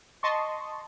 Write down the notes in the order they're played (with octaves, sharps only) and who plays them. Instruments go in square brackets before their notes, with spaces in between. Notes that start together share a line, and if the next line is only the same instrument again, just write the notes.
[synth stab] D#5 A5 C6 C#6